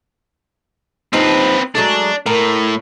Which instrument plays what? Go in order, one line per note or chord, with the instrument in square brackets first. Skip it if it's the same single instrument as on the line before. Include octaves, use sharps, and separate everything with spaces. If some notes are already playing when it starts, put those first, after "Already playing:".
[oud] G2 F3 D#4 [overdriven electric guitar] C4 B4
[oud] F#3 G#3 A3 [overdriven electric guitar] D4
[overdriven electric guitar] A2 [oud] A#4